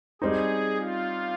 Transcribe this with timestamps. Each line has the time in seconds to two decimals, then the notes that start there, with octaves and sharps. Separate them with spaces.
0.22 G3 C4 D#4 G#4
0.75 F4